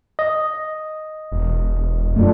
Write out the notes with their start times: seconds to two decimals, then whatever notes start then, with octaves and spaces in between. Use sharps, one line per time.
0.19 D#5
1.32 E1
2.16 F#2 A3 D4 F4